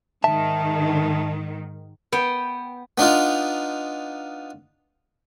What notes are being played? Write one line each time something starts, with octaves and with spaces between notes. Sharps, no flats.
G#2 D#3 E5 A5
B3 G5
B3 D4 D#4 F4